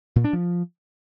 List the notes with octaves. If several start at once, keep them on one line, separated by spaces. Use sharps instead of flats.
A#2
D4
F3